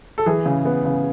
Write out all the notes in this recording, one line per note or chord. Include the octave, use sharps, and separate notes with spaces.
A4
E3 G#4
C#3
B3
C#3